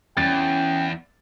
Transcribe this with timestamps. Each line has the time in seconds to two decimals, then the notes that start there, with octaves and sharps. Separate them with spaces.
0.17 E2 C#4 G5 A6